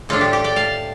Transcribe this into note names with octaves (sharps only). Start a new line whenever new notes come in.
A2 F3 D4 F4 A4
G4
G4
D5 G5
F5 A5